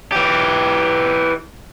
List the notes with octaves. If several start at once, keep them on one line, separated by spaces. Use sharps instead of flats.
E3 G4